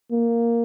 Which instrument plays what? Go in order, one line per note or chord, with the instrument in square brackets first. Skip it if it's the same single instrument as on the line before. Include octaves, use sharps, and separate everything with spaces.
[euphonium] A#3